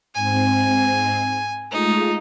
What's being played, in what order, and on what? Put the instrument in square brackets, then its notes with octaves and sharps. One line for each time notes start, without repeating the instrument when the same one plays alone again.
[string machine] G#2 C4 [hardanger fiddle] G#5
[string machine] G#3 A3 F4 [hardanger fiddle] D#4